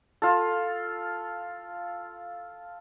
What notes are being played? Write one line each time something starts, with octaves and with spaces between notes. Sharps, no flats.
F4 A4